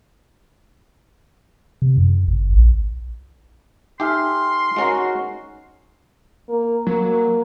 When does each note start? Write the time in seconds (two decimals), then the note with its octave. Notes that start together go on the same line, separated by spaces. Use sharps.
1.82 C3
1.98 F#2
2.28 G1
2.54 A#1
4.00 D#4 G4 A4 E5 G#5 C6 F6
4.76 G#3 C#4 F#4 A#4
6.49 A#3
6.87 F#3 A#3